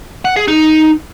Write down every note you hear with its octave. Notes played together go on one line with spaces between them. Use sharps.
F#5
G#4
D#4